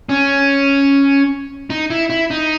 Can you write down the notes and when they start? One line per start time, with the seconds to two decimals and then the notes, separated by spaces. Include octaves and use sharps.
0.09 C#4
1.70 D#4
1.90 E4
2.10 E4
2.31 D#4